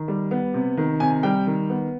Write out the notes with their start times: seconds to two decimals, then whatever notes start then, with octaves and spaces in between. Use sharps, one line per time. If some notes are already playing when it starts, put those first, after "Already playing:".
Already playing: D#3
0.08 G3
0.31 B3
0.54 C3
0.77 D#3
1.00 C3 G#5
1.23 G3 G5
1.47 D#3
1.70 B3